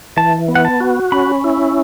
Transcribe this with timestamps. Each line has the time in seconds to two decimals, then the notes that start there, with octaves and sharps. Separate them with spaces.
0.17 E3 A5
0.48 B3
0.55 F#5
0.65 A5
0.80 F#4
1.12 C#4 B5
1.44 E4